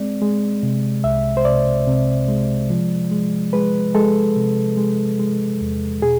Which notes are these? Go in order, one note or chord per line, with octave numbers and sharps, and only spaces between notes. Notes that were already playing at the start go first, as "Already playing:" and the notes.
Already playing: G#3 C4 D5
G#3
C3
C2 E5
C5
C3 D5
C3
G#3
F3
G#3
G#3 B4
G#3 A4
C3
G#3
G#3
E2
B2 G#4